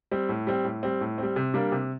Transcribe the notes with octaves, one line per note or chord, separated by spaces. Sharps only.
G3 C4
A2
G3 C4
A2
G3 C4
A2
G3 C4
C3
G3 A#3 D4
C3